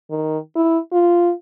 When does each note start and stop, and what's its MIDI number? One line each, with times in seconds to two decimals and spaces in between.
0.10 0.38 51
0.56 0.78 64
0.92 1.32 65